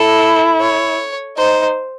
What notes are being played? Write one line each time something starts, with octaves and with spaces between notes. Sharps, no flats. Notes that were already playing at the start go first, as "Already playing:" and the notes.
Already playing: E4 A4
C#5
D#4 C5